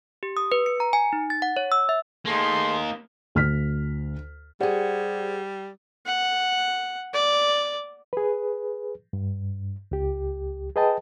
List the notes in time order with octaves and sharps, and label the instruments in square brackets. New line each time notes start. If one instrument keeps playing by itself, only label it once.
[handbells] G4
D#6
B4
C#7
A#5
G#5
D#4
A6
F#5
C#5
E6
E5
[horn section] A3 G#4 C6 [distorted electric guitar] A#3 D#4
[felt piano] D2 F6 B6
[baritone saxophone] G3 [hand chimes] G4 C5 D5 [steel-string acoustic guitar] G#4 F#5
[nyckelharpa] F#5
D5
[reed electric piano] G#4 B4
G2
C#2 G4
G#4 B4 D#5 G5 A5